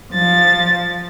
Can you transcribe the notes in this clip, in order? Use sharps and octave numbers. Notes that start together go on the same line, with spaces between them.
F3 A6